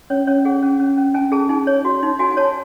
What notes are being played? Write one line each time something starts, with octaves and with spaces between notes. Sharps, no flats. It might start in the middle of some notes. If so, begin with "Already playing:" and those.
C#4 C#5
C#4 C#5
G#4 F#5
C#4
C#4
C#4
C#4 G#5
G#4 A5
D#4 G#5
C#5
F#4
D#4
F#4 G#5
G#5
C#5 A5